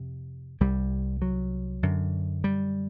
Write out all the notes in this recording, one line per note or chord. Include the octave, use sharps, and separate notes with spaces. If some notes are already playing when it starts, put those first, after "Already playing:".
Already playing: F2 C3
C2 C3 G3
F#3
F#2 D3
G3